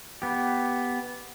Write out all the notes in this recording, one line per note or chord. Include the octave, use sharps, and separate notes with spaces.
B3 G4